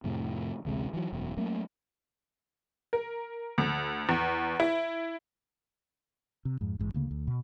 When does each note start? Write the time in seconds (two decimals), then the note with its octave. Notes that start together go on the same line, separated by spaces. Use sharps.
0.04 F2 A2 C3 F3
0.65 A1 D2 C3 G#3
0.94 E3 F#3
1.13 E1 F#2 B2
1.37 F#3 A3 A#3 C#4
2.93 A#4
3.58 D2
4.09 E2
4.60 E4
6.45 C3
6.61 F2 G#2
6.79 A1 G#2
6.94 D2 C#3 A#3
7.11 D2
7.27 B2